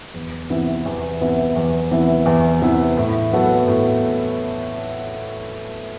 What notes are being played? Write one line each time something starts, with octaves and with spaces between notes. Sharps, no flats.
E2
C3 E3 B3 E4
E2
C3 E3 B3 E4
E2
C3 E3 B3 E4
E2
C3 E3 B3 E4
A2
F#3 B3 F#4 A4
A2